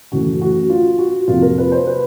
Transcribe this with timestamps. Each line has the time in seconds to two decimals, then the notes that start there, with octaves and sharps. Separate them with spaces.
0.12 F#2 C#3 E3 A3 F#4
0.42 F#4
0.70 F4
0.99 F#4
1.28 F2 C3 F3 A#3 F4
1.42 A#4
1.58 B4
1.72 C5
1.87 B4